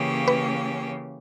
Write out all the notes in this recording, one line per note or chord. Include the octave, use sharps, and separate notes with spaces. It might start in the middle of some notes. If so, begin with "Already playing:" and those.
Already playing: C#3 E3 A#3 C#4 G4
B4